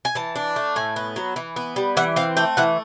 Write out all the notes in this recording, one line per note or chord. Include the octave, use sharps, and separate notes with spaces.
G#5
E3 A5
D4
A3
A2 G#5
B3
F#3
E3
B3
G3
E3 F#5
C4 F5
A3 G5
E3 F#5